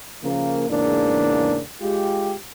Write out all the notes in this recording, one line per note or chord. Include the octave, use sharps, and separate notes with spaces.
C#3 F3 A#3
E2 G#2 C#3 A#3 D4
G#3 F4 G4